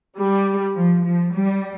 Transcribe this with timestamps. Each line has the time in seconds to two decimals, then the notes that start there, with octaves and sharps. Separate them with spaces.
0.17 G3
0.76 F3
1.05 F3
1.35 G3